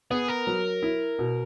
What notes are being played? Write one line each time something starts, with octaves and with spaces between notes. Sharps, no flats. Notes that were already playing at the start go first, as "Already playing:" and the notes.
B3 G#4
A#4
F#3
E4
B2